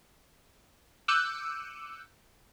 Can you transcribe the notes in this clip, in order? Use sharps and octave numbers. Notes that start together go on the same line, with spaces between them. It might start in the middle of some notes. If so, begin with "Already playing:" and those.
D6 E6 F#6 G6 C#7 D#7